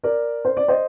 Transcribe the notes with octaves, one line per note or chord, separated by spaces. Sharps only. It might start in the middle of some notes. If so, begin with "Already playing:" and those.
A#4 D5
C5
D5
C5 D#5